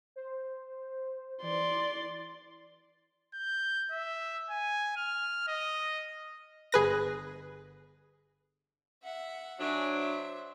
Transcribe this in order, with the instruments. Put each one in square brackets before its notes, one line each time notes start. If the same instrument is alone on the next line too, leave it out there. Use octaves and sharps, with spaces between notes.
[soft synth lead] C5
[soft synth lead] E3 [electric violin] D5 C6
[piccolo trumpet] G6
E5
G#5
F6
D#5
[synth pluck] G1 G#4 B4 A#6
[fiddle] E5 F#5
[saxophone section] F#3 D4 [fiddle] E5 G#5
[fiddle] C5 E5